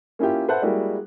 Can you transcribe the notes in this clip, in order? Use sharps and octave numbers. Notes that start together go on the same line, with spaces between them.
A#3 C#4 E4 F4 G4
B4 C5 E5 F#5 A5 F#6
G3 G#3 A#3 E4 F#4